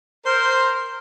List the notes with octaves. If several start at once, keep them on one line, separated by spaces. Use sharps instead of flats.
A#4 C5